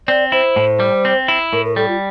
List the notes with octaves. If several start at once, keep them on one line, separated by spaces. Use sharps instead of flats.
C4 D5
E4 C5
A2
G3
C4
E4
A2 A#4
A#4
G3 A4
F4